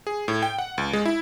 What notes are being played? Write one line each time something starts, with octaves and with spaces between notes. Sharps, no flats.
G#4
A2
G5
F#5
C#2
G#3
E4